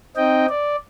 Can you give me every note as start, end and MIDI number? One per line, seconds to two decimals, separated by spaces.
0.16 0.46 60
0.16 0.46 63
0.16 0.46 75
0.16 0.46 79
0.49 0.76 74